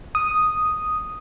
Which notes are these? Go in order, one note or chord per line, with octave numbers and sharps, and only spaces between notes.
D#6